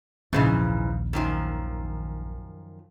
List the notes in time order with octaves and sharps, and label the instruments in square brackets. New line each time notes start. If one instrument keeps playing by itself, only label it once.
[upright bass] A#1 D#2 [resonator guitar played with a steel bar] G#2 C#3 E3
[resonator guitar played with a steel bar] F#2 D#3 F3